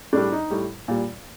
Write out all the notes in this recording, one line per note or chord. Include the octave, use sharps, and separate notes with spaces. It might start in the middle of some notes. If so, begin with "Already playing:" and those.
A2 G3 D4
D#4
A2 G3
A#2 G3